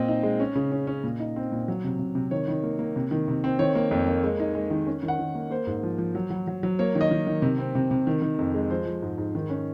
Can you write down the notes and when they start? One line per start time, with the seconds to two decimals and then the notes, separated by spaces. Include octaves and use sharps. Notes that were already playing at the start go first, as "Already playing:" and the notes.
Already playing: A#2 C4 D#5
0.08 D#4
0.23 G#3
0.40 C#4
0.55 C#3
0.72 C#4
0.87 C#4
1.04 A#2
1.20 D#4
1.36 C4
1.52 A#2
1.68 F#3
1.84 C3
1.99 C3
2.15 C3
2.31 D#3 C#5
2.48 D#3
2.63 A#3
2.79 A#3
2.96 C3
3.11 D#3
3.28 C3
3.44 C4
3.59 D#3 C#5
3.75 A#3
3.91 F2
4.07 A#3
4.24 G#3
4.40 D#4
4.55 G#3
4.71 D#3
4.87 C#4
5.03 D#3
5.08 F#5
5.19 D#3
5.35 A#3
5.50 A#3 C5
5.67 G#2
5.83 F3
5.98 F3
6.15 F#3
6.30 F#3
6.47 F#3
6.63 F#3
6.79 A#3 C#5
6.95 D#3
7.01 D#5
7.11 D#3
7.27 D#3
7.42 C3
7.58 C4
7.75 C3
7.91 C3
8.07 D#3
8.22 D#3
8.39 F2
8.54 G#3
8.70 F3 C5
8.86 F3
9.03 G#2
9.18 G#2
9.35 D#3
9.50 C#4